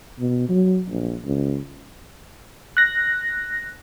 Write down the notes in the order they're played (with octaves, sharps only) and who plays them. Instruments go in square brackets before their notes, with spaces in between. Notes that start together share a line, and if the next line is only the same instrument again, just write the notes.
[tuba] B2
F#3
A#1
C#2
[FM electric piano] F#6 A#6